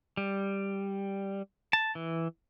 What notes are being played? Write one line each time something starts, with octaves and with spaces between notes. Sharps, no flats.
G3
A5
E3